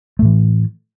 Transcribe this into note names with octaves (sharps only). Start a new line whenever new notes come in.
A2 E3 A3